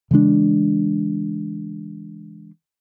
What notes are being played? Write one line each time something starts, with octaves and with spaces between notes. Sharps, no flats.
C#3 E3 G#3 D4